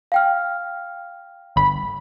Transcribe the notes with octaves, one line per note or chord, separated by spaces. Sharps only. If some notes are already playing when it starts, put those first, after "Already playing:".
F5 G5 F6
G1 B5